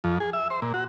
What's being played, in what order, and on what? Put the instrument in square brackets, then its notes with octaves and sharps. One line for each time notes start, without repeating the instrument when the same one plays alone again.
[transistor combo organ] F2
G#4
E5
C5
A#2
F#4